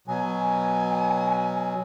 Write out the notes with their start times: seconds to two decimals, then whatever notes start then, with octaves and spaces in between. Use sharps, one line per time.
0.08 B2 F#3 G#5